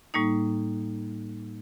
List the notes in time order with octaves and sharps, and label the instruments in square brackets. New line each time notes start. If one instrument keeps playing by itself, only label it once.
[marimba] A2 G3 A#3 D#4